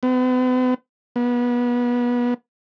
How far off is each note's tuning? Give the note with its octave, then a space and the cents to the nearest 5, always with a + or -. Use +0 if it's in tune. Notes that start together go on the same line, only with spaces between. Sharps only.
B3 +45
B3 -25